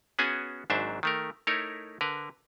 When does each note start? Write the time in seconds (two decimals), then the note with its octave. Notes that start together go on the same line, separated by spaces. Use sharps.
0.19 B3 C#4 F#4 G#4 G#5
0.70 G#1 G#2 F#3 D4 C5 E5
1.03 D#3 A3 A#4
1.47 A3 D#4 E4 A#4 C#5
2.01 D3 A#4 B4